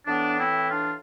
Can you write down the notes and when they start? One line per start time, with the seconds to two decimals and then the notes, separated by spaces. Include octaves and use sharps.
0.07 A2 E3 B3 D4
0.39 C4 E4
0.70 D4 F4